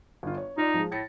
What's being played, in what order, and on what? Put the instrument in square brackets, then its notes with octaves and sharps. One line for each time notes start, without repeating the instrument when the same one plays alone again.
[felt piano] G1 F4
C#5
[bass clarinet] D#4 [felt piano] F4 D5
[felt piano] F3 G#3
[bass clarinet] A2 [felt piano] A6 A#6 C#7